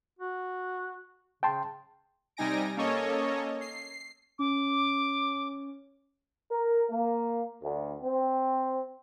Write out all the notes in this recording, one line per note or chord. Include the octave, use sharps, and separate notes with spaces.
F#4
C#3 G5 A5 C6
C3 G3 D#4 G#5 A#6 D7
A#3 C#4 A4 C#5 D#5
C7
C#4 D6
A#4
A#3
D2
C4